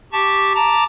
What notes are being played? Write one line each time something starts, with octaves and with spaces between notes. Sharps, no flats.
G4 A5 C#6
A5 A#5 D6